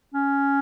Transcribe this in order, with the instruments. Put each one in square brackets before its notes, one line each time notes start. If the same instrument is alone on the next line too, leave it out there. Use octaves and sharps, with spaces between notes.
[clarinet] C#4